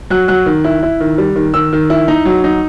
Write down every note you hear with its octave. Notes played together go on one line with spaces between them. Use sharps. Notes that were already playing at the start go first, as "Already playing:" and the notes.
F#3 F#6
F#3 F#6
D#3
E4
E4
D#3
G3
D#3
D#3 E6
D#3
E4
D#4
F#3
D#4